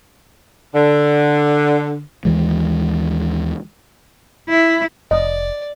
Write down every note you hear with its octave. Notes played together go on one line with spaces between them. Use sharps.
D3
D#2 E3 G#3
E4
F1 D5 D#5